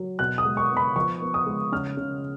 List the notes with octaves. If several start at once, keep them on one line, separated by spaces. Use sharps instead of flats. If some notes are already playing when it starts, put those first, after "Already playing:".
Already playing: F#3
B2 F#6
D#6
G#3
C#6
B3
B5
F3 C#6
B3
D#6
G#3
C#3 F6
C#3